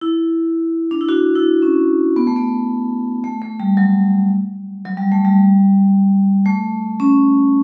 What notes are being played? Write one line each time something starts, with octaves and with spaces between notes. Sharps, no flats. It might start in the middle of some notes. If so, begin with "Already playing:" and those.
E4
D4
E4
D4 F#4
E4
C#4
B3
A3
B3
A3
A3
G3
F#3
F#3
G3
A3
G3
A3
C#4